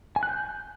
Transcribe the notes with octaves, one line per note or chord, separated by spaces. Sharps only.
G#5
F#6
G6